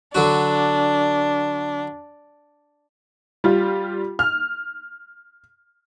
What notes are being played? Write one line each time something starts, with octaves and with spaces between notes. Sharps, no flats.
D3 F#3 D4 F#4
G3 F4
F6